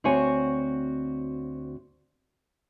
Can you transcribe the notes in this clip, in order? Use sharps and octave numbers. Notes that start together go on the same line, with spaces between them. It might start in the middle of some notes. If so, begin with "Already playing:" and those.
D2 C4 F#4 C#5 G#5